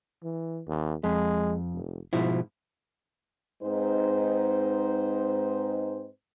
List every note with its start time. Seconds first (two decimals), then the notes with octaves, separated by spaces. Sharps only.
0.23 E3
0.67 D#2
1.04 F2 G#3
1.74 F1
2.13 G#2 B2 F3 E4
3.63 G#2 G#3 C4 D#4 B4 C5